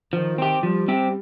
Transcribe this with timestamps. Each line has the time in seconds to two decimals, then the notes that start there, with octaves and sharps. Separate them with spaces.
0.13 D#3 F3
0.38 C4 G4
0.63 F3 G3
0.88 C4 G4